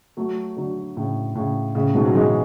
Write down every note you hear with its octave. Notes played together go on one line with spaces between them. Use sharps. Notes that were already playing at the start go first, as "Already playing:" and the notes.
F#3 A3
D3 F#3
A2 C#3
A2 C#3
A2 C#3
G#2 B2
F#3
E3 G#3